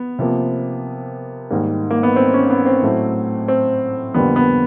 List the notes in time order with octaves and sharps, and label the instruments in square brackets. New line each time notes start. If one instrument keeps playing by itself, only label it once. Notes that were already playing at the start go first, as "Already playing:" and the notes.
Already playing: [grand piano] B3
C3 F3 A#3
G#2 D#3 G3 A#3
A#3
B3
C4
C#4
B3
C4
A2 F#3 A3
C4
F2 D3 G3 A#3 B3
B3